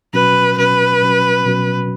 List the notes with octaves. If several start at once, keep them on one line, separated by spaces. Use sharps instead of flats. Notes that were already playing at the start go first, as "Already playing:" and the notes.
B2 F#3 C#4 F#4 B4
B2 F#3 C#4 F#4 B4
B2 F#3 C#4 F#4
B2 F#3 C#4 F#4